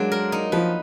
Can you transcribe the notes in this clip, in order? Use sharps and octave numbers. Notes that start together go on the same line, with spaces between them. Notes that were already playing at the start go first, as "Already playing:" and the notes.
Already playing: F#3 G#3 A#3 D4
A#4
D#4
F3 B4